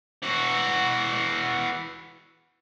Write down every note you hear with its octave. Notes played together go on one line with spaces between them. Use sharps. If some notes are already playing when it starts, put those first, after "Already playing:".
E3 F#4